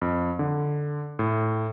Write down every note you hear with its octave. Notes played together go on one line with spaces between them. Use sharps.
F2
D3
A2